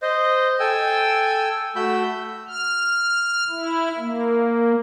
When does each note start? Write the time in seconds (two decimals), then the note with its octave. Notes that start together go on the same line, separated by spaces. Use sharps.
0.02 C5 D#5
0.60 A4 G5 G#5 E6
1.76 A3 F#4 B5 E6 G6
2.48 F6
3.49 E4
3.98 A#3